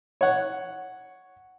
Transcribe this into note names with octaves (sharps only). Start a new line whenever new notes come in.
C#5 F#5